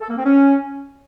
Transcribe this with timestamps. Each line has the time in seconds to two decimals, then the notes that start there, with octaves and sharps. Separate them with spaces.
0.01 A4
0.09 A#3
0.17 C4
0.24 C#4